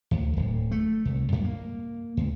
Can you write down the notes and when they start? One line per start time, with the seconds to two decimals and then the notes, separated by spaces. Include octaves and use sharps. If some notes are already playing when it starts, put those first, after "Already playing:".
0.11 D2
0.37 D1
0.71 A3
1.05 C2
1.32 F#2
1.45 A#3
2.17 C#2